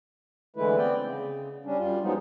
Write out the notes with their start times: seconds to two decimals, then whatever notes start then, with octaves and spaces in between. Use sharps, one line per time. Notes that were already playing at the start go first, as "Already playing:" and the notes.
0.56 D3 E3 G#3 A3 E4 B4
0.78 B3 C4 D5 G5
1.01 C#3
1.65 G3 C#4 D4
1.79 F#2 G3 F4
2.03 F3 F#3 G#3 B3 D#4